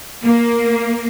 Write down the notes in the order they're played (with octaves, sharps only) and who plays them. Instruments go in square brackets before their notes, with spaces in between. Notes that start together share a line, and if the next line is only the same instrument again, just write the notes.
[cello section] A#3